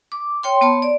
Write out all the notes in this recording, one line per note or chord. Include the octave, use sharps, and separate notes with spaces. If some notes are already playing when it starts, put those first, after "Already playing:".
D6
C#5 G5 C6
B3 C#5 A5 C6
D5